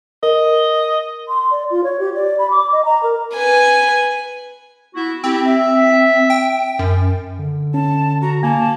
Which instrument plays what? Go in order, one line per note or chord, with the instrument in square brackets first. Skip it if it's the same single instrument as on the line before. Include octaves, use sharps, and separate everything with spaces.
[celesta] A#4 [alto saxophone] D#5
[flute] C6
D5
F4
C#5
G4
D5
B5
D6
D#5
A#5
A#4
[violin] B4 G#5
[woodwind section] B3 E4 F#4
[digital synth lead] C4 [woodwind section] E4 G4
[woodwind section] E5
[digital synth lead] G5
F#2
[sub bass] D3
[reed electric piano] C#4 [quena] A5
[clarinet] F#4 [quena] A#5
[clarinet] A#3 [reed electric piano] G#5 [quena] A5